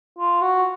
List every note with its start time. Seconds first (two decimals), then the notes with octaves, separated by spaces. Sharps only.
0.19 F4
0.41 F#4